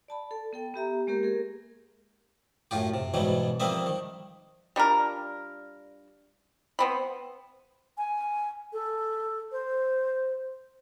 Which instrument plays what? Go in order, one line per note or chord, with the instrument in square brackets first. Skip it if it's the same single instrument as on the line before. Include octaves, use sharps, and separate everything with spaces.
[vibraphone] D5 A5 B5
A4
B3 A4 G5
B3 G4 E5 A#5
G#3 A#3 G4 A#4
G#4 A#4
[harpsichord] F#2 A2 F4 G4
C3
G#2 B2 E3 F#3 G3
F3 G3 A#3 C4 D#5 E5
D#3
[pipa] G3 D4 F4 A#4
B3 C4 B5
[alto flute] G#5
A4
C5